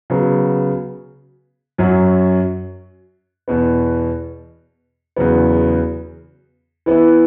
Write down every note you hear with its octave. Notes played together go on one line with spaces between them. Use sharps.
C#3 F#3 B3
F#2 F#3 C#4 F#4
E2 B2 B3
E2 C#3 F#3 B3
E3 B3 E4